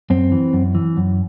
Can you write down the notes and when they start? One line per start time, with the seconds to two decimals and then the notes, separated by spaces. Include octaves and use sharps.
0.10 F#2 C4
0.32 E3
0.53 F#2
0.75 E3
0.97 F#2